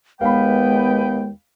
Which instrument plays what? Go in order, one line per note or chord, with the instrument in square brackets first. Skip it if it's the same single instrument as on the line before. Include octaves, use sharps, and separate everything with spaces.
[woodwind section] D#2 B4 G5 [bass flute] G#3 [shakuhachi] B3 [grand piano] F5 B5